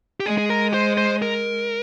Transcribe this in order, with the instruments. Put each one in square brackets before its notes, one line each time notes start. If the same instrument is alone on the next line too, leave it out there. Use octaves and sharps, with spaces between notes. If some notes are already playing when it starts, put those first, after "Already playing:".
[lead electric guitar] G4
[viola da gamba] G#3 [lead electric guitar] G#4
[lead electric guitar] G#4
A#4
C5
C5
A#4